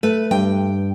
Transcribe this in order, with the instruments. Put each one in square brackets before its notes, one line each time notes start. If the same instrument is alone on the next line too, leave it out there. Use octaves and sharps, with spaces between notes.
[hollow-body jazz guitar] A3 [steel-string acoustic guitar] B4
[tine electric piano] G2 [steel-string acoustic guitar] G5